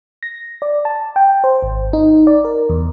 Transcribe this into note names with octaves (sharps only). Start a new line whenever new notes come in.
A#6
D5
A5
G5
C5
G#1
D#4
D5
A#4
E2